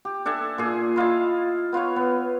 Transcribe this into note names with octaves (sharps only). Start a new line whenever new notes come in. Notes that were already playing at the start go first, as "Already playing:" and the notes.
G4
D4 A4 E5 G#5
A#2 G#4
E4 F4 D#5 A5
B3 F4 B4 C#5
B3